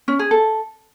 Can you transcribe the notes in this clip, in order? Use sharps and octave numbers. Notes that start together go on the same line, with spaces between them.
C#4
G#4
A4